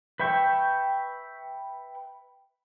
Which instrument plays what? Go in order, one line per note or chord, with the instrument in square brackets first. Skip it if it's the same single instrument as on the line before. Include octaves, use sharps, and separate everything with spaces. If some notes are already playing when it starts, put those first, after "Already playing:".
[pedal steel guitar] B4 E5 G5 C#6